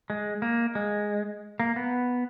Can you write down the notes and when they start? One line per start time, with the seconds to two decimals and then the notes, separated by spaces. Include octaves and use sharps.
0.10 G#3
0.42 A#3
0.75 G#3
1.60 A#3
1.76 B3